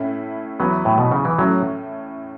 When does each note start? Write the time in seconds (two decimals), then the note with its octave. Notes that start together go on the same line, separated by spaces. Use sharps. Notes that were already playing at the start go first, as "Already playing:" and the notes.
Already playing: A2 A3 C#4 E4
0.59 E2 E3 F#3 B3 E4
0.85 A2
0.98 B2
1.12 C#3
1.25 E3
1.38 A2 F#3 A3 C#4